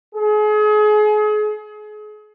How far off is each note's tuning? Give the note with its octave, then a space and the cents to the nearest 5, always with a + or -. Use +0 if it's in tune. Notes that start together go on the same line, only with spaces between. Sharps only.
G#4 +35